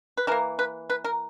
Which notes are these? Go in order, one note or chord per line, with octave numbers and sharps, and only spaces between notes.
B4
E3 A#3 A#4
B4
B4
A#4